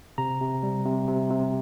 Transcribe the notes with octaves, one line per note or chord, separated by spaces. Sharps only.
C3 A#5
C3
G3
C3
C3
C3